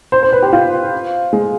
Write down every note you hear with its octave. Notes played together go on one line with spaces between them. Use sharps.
C5
C5
B4
G4
F4
G#3